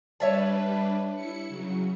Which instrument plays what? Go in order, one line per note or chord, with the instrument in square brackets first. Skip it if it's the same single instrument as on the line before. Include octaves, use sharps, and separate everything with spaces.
[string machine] G3 D4 B4 [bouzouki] C#5 E5 A5
[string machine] E4 C#7
C#3 F#3